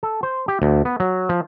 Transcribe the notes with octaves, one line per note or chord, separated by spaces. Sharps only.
A4
C5
G4
D2
B3
F#3
F3